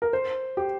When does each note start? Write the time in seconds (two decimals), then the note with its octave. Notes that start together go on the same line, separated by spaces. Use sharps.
0.02 A#4
0.13 C5
0.57 G4